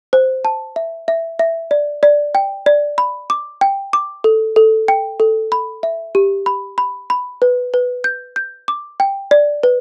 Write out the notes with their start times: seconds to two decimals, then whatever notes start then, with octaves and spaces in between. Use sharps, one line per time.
0.13 C5
0.45 A5
0.76 E5
1.08 E5
1.39 E5
1.71 D5
2.03 D5
2.35 G5
2.66 D5
2.98 B5
3.30 D6
3.61 G5
3.93 D6
4.24 A4
4.56 A4
4.88 G5
5.20 A4
5.52 B5
5.83 E5
6.15 G4
6.46 B5
6.78 B5
7.10 B5
7.42 B4
7.74 B4
8.04 G6
8.36 G6
8.68 D6
9.00 G5
9.31 D5
9.63 B4